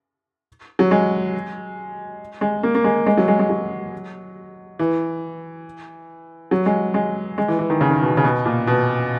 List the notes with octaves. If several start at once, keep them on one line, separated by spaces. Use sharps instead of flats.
F#3
G#3
G#3
A#3
A#3
G#3
G#3
F#3
G#3
G#3
F#3
E3
F#3
G#3
G#3
G#3
E3
E3
D#3
C#3
D#3
B2
C#3
B2
A#2
B2